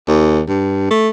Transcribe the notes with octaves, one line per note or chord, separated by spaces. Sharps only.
D#2
G2
A3